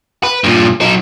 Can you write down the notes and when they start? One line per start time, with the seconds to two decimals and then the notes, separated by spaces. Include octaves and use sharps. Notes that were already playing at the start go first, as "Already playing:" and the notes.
0.24 B4
0.44 G2 A#2
0.81 F#3 D#4